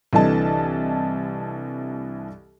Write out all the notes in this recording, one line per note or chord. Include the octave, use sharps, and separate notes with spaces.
C2 D3 E3 A4 D#5 A5